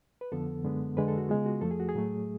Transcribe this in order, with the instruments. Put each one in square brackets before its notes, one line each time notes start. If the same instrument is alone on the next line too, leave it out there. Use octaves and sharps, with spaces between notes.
[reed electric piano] B4
F2 D3 F3 B3 A4
F#2 D3 G#3 B3
F2 D3 G#3 B4
A4
F#4
C#3 G#3 B3 F4
F#4
F2 F3 A3 A4
G#4
F#4
G#4
A2 F#3 A3